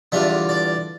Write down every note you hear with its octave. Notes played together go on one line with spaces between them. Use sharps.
E2 D3 G3 D4 F4 E5
D5